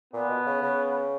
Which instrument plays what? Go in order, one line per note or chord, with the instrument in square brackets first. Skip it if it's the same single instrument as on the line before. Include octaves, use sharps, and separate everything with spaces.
[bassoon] A#2 [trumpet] B3
[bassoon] B2
C#3
C#3